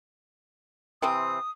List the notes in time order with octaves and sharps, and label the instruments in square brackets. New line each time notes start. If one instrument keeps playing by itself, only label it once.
[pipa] C3 E3 C4 [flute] D#6